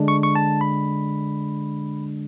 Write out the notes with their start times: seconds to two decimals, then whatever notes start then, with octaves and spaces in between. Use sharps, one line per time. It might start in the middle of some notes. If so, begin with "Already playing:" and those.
Already playing: D3 G#3 D4
0.08 C#6
0.23 C#6
0.35 A5
0.61 B5